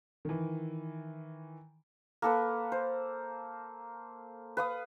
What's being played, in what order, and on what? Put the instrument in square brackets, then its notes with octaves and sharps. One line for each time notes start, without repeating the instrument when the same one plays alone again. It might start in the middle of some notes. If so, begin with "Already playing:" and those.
[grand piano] D#3 E3
[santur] A#3 A4 B4
C5
B4 F5 D#6